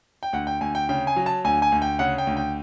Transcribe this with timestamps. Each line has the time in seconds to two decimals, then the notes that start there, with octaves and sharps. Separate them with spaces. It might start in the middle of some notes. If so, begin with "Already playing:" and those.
0.23 G5
0.33 D2 F#5
0.47 G5
0.61 D2 G#5
0.75 G5
0.89 C#3 G5
1.07 G#5
1.16 F#3
1.26 A5
1.44 D2 G#5
1.62 G#5
1.72 D2
1.82 G5
1.99 C#3 F#5
2.18 G5
2.27 D2
2.36 G5